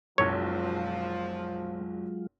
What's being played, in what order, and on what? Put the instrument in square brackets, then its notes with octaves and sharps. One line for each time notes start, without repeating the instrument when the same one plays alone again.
[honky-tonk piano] F#1 B1 [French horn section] F3 [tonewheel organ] F#3 G#3 F4 [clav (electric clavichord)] C#5